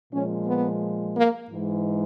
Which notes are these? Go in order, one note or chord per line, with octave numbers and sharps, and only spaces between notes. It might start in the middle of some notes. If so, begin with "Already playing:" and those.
A#2 F3 G#3 C#4
B3
A#3
G#2 E3 G#3